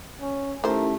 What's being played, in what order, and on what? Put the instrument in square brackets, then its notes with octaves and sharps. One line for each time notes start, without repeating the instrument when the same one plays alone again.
[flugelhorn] C#4
[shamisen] D#3 C5 [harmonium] A3 [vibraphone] C#4 E4 G4 [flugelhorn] A#4